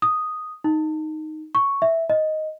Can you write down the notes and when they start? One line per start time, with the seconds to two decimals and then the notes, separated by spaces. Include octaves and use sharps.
0.02 D#6
0.64 D#4
1.55 C#6
1.82 E5
2.10 D#5